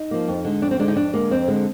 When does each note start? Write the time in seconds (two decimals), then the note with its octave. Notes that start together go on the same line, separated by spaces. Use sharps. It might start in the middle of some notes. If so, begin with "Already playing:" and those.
Already playing: D#4
0.11 F3 A#3
0.28 F2
0.44 D3 G#3
0.62 F2 D4
0.71 C4
0.79 D3 G#3 D4
0.88 D#4
0.96 F2 D4
1.13 D3 G#3 A#3
1.30 F2 C4
1.48 D3 G#3